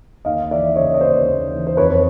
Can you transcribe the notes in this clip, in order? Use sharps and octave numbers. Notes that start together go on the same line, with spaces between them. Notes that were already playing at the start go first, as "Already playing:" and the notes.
D#2 D#5 F5
E3 D5 E5
C#3 C#5 D#5
D#5
D#2 C5 D5
D#2
E3
C5
F2 B4 C#5